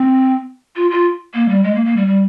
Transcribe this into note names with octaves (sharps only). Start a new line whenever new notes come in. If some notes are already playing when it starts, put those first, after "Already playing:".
Already playing: C4
F4
F4
A#3
G3
G#3
A#3
A#3
G3
G3